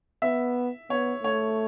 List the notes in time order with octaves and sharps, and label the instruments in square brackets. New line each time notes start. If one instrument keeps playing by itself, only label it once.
[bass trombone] B3 [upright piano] E5
[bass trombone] B3 [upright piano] C#5
[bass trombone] A3 [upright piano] C#5